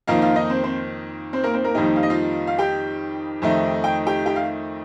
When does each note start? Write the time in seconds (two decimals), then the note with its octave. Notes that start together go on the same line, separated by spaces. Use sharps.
0.07 F2 D#3 A#3 D#4 F4 F5
0.22 F4 F5
0.36 D#4 D#5
0.49 C4 C5
0.63 C4 C5
1.33 C4 C5
1.43 A#3 A#4
1.53 C4 C5
1.64 A#3 A#4
1.75 F2 D#3 G3 A#3 D#4 G4
1.96 F5
2.03 D#5
2.10 F4 F5
2.47 F5
2.58 G4 G5
3.42 F2 D#3 A3 D#4
3.84 G5
4.06 G4 G5
4.26 G4 G5
4.36 F5